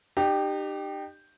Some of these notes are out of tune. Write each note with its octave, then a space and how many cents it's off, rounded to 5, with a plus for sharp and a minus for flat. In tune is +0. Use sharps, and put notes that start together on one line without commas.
D#4 -40 G4 +0